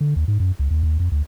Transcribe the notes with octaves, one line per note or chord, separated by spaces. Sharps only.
D3
D#2
G#2
F#2
C#2
D#2
D#2
F2
D2